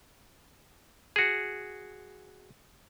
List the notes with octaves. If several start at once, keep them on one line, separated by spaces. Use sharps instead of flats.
F#4 G#4